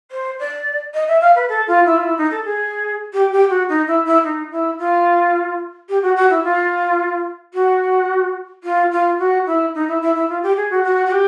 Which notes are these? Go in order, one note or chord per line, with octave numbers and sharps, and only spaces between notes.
C5
D5
D#5
E5
F5
B4
A4
F4
E4
F4
E4
D#4
A4
G#4
G4
G4
F#4
D#4
E4
E4
D#4
E4
F4
G4
F#4
F#4
E4
F4
F#4
F4
F4
F#4
E4
D#4
E4
E4
E4
F4
G4
G#4
F#4
F#4
F#4
G4